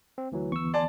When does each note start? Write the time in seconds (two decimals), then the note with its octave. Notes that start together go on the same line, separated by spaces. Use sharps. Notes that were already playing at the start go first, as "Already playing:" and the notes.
0.18 C4
0.32 D2 E3 F#3
0.52 D2 E3 B3 C#6 E6
0.74 D5 G#5 A5 C6